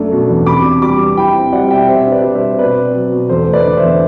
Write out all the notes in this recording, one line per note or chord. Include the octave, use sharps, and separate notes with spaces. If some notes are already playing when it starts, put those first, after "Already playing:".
Already playing: F#2 A3 D4
B2
E2
C3 B5 D6
D4
G3 B5 D6
C3
E4 G5 B5
C4
G3 D5 F#5
B2 E5 G5
C3 C5 E5
D4
B4 D5
G3
C5 E5
C3
B2 B4 D5
C4
F#3
B2
E2 A4 C5
A3
B4 D5
D3
C5 E5
E2